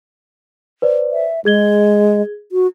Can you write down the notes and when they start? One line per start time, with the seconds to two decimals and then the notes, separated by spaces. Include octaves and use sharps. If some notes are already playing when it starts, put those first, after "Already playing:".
0.82 B4 C5 D5
1.12 E5
1.45 G#3 G#4 G#6 G7
2.52 F#4